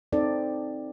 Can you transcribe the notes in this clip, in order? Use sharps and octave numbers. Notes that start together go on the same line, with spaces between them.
C4 D#4 A4 C5 D5